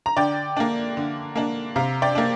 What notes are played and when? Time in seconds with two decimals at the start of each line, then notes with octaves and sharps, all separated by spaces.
0.06 A#5
0.17 D3 D5 G5
0.57 A#3 D4
0.97 D3
1.36 A#3 D4
1.76 C3 F5 A#5
2.02 D5 G5
2.15 A#3 D4